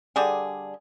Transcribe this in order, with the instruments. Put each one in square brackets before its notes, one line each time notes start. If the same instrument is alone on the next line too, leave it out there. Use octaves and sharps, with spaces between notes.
[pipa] D3 G3 G#4